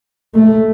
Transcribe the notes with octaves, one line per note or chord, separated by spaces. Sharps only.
A3